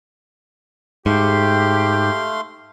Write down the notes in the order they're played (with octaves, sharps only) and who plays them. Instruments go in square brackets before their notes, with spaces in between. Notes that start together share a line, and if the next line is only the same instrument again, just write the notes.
[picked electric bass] G#2 [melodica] A3 F5 C6 [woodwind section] G4